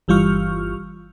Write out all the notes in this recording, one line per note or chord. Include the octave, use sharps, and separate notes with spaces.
G1 E3 G3 F4 C#6 F6